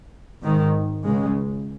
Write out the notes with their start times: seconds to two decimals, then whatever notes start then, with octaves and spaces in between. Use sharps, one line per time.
0.42 G#1 G#2 D#3
1.04 C#2 C#3 G#3